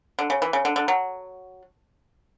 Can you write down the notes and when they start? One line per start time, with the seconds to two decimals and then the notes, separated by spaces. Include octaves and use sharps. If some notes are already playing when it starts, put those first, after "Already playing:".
0.19 D3
0.30 C#3
0.42 E3
0.53 C#3
0.65 D3
0.76 D3
0.88 F#3